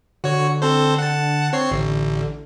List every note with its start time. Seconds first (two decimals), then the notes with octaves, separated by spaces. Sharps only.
0.24 D3 F#4 C#5
0.62 C4 A4 C5
0.98 F#5 A5
1.53 C4 C#5 C7
1.71 A1 D3